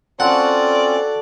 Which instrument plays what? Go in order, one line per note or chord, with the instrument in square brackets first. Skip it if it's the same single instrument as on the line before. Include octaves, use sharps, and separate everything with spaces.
[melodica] C4 C#4 F4 [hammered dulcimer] F#4 A4 A5 [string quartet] D5 [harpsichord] F#5